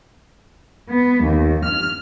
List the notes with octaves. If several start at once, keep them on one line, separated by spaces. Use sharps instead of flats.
B3
D#2
F6